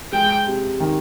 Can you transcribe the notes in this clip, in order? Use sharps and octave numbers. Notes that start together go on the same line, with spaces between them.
G#3 G5
C3
D#3